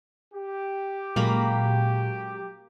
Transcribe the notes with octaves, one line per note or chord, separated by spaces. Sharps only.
G4
A#2 F#3 G#3 A#3 C#4 F5 B5